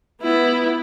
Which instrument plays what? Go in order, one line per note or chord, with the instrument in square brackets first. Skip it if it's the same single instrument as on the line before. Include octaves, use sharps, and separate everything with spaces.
[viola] B3 E4